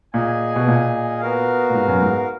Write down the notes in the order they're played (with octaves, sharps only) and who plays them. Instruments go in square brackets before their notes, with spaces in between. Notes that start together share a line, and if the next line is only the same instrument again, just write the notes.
[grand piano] A#2 [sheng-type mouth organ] G#4 D#5 G#5
[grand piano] B2
A#2
[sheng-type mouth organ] B3 F#4 A#4 F5
[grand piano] A#2
G#2
F#2
G#2